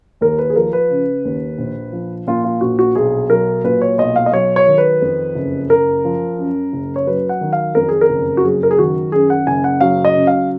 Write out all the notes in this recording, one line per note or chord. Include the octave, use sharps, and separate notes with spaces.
D#2 A#4
B4
G#4
F3 A#4
B4
C#3
D#2
A#1
F3
A#2 F4
F4
A#1 F#4
F#4
B1 G#4
F#3 A#4
A#2 B4
C#5
B1 D#5
F5
D#5
F#3 C#5
C#5
D#3
B4
F2
F#1
F#1 A#4
F3
F#2
F#1
C#5
F#3 B4
F#5
D#3
F5
F2 A#4
G#4
A#4
F#1
F#4
F#3 G#4
A#4
G#4
D#3 F#4
F#2 G#4
F#5
F#1 G#5
F#5
F#3 F5
D#5
C#3
F5